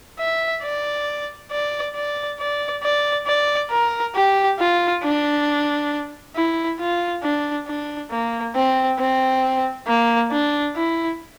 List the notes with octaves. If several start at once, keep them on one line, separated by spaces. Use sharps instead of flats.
E5
D5
D5
D5
D5
D5
D5
A#4
G4
F4
D4
E4
F4
D4
D4
A#3
C4
C4
A#3
D4
E4